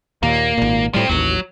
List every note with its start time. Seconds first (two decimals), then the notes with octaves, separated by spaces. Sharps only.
0.23 D#2 A#2 A#3
0.58 G#1 A#2
0.94 A2 F3 G3 C4
1.09 A1 D#2 F#3